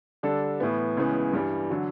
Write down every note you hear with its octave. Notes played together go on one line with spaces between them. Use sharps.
D3 G3 D4 A4
A2 E3 B3
C#2 C#3 E3 B3
G2 E3 G3
D3 F#3